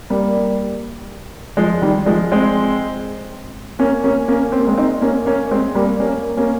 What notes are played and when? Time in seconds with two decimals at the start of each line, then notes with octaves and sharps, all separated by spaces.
0.10 G3 A#3
1.57 F3 G#3
1.82 D#3 G3
2.06 F3 G#3
2.32 G#3 C4
3.79 A#3 C#4
4.04 A#3 C#4
4.28 A#3 C#4
4.52 C4
4.59 A#3
4.67 G#3 C4
4.77 C4 D#4
5.01 A#3 C#4
5.26 A#3 C#4
5.51 G#3 C4
5.75 G3 A#3
6.00 A#3 C#4
6.37 A#3 C#4